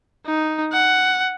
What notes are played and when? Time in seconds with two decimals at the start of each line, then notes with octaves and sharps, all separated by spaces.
0.26 D#4
0.72 F#5